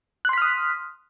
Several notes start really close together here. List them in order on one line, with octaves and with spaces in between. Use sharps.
F#6 C6 B6 F6 D#6